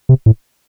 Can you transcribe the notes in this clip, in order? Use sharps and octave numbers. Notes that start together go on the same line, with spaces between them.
C3
A2